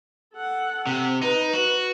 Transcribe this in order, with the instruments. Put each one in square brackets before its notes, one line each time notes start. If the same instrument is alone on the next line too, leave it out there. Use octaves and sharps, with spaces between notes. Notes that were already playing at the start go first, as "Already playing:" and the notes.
[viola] A4 F#5
[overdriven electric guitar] C3
[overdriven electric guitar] D#4 [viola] B4
[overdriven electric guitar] F#4 [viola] B4